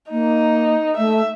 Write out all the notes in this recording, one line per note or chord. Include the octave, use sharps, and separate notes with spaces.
A#3 D#4
A3 E5